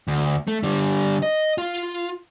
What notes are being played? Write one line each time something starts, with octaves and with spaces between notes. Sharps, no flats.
D2
A3
D3 G3
D#5
F4